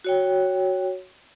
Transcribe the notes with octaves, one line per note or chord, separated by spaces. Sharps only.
F#4 C#5 G5